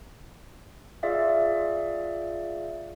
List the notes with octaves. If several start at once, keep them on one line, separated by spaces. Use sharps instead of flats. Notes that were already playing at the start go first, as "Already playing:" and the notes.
F4 G#4 D5 E5 F5